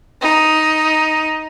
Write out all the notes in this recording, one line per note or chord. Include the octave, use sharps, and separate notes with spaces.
D#4